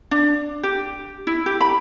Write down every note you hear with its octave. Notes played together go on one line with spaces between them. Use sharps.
D4
G4
E4
G4
B5